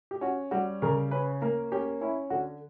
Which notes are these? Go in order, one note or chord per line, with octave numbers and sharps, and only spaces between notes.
G4
C#4 F#4
G3 F#4
C#3 A#4
C#4 B4
A#3 A#4
C#4 G4
C#4 E4
D3 F#4